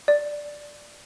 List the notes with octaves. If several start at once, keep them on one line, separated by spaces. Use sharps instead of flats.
D5